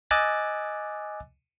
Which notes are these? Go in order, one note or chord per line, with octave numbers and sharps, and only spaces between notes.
D#5 G#5 D6 E6 F#6 A6